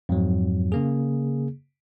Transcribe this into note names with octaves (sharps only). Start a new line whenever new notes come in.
F2 G#2 F#3
C#3 A#3 G#4